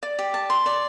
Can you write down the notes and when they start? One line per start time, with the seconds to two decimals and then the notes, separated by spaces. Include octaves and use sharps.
0.03 D5
0.19 G4
0.34 A5
0.50 C6
0.66 D5